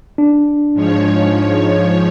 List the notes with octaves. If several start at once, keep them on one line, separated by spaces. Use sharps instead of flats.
D4
G#2 F3 C#5